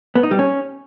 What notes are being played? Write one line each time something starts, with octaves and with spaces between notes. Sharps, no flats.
B3
D#4
G3
C#4